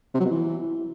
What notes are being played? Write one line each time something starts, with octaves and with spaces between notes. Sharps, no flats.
C3
F#3
B2
E3